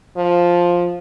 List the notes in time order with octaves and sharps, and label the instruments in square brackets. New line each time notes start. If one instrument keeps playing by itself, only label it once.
[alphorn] F3